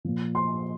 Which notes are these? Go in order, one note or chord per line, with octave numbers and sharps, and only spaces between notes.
A#2 F3
C6